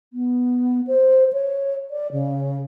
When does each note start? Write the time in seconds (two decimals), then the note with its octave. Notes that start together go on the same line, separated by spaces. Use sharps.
0.13 B3
0.87 C5
1.33 C#5
1.90 D5
2.12 C#3